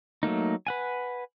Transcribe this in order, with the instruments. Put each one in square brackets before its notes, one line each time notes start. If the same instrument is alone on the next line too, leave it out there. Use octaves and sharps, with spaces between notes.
[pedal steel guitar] F#3 A3 A#3 D#4
B4 F#5 G#5